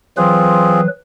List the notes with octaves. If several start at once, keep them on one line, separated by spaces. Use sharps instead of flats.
E3 F#3 C4 F4 G#4 B4